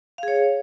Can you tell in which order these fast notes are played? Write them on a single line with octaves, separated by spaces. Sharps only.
F5 G#4 C#5